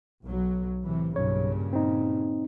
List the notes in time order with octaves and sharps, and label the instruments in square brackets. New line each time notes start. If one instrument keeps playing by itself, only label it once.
[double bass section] B1 F#3
A2 C3 E3
[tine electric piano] B1 C#5 [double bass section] G2 A#2 C#3
[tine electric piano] C4 D#4